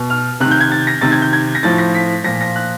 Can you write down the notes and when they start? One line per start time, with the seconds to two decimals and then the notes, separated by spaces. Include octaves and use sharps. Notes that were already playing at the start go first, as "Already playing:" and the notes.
Already playing: B2
0.10 F6
0.40 C3 F#6
0.45 D#3
0.51 G6
0.60 G#6
0.72 A6
0.87 A#6
1.01 C3 D#3 A6
1.12 G#6
1.22 G6
1.33 G#6
1.55 A#6
1.63 A2 F3 A6
1.78 A#6
1.94 B6
2.24 A#2 F3 A#6
2.41 A#6
2.56 F#6